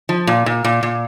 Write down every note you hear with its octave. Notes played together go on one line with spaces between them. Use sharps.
F3
A#2
A#2
A#2
A#2